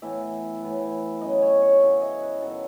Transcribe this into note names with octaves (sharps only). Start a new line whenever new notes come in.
A2 E3 B3 E5
A2 E3 B3
F#2 C#3 F#3 D#5
C#5
C#5
F#2 C#3 F#3 E5
D#5
B4
F#2 D#3 F#3 B3 A4